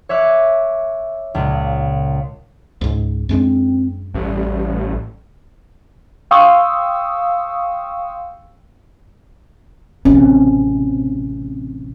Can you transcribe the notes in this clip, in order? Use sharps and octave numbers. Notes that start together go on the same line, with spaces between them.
C#5 E5 D6 F#6
C#2 A#2
C#2 G#2
F#2 G#3 C4 D4
A1 G3
F5 G5 C6 C#6 D#6 E6
A1 C3 C4 C#4